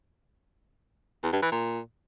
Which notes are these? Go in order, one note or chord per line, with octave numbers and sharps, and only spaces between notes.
E2
G2
E3
A#2